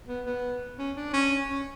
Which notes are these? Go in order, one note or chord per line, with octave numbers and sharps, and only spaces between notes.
B3
B3
C#4
D4
C#4
C#4